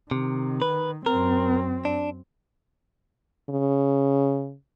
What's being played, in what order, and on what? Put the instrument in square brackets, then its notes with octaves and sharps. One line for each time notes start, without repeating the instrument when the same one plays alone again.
[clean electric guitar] C3 [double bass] D#3
[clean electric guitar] B4
[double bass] F#2 C4 [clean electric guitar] A#4
[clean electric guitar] D4
[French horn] C#3